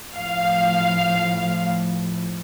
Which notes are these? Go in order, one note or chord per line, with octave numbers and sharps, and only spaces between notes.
A2 F3 F5